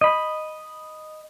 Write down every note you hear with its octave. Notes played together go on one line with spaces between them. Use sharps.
D#5 B5